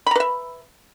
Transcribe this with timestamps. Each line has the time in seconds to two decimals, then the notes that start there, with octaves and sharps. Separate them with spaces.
0.06 B5
0.11 A#5
0.16 B4
0.20 E5